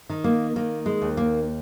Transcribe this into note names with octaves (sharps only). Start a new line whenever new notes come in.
D#3
A#3
D#3 A#3
G#3
D#2
A#3